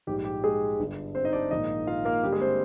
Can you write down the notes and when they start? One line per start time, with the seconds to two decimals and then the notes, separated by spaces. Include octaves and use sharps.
0.07 A#1 G#2 G3 G4
0.24 G4
0.44 G#3 G#4
0.79 G1 G2 D3
1.15 C4 C5
1.24 D#4 D#5
1.33 D4 D5
1.51 A#1 G#2 D#3 A#3 D#4 D#5
1.87 F4 F5
2.05 A#3 A#4
2.23 G2 D3 G3 A#3 G4
2.32 G#3 G#4
2.41 C4 C5